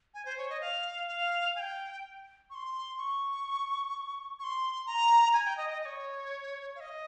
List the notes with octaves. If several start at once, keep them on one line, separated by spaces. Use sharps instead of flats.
G#5
C5
C#5
D#5
F5
F5
G#5
G5
C#6
C6
C#6
C#6
C6
A#5
G#5
G5
D#5
D#5
D#5
C#5
F5
D#5